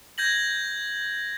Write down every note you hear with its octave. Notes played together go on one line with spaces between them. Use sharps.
G6 G#6 A#6 F#7